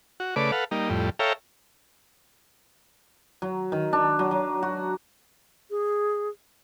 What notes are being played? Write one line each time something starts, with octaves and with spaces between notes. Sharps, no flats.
F#4
C#3 A3 B4 D5 D6
A4 B4 F5 F#5
G3 A#3 D#4
F2 A2 G3
A4 C#5 E5 F5 G5 A#5
F#3
D#3
D4
F#3
F#3
F#4
G#4